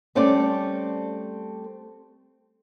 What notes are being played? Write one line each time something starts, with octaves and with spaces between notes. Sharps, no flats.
G3 A3 C4 C#4 A4 D5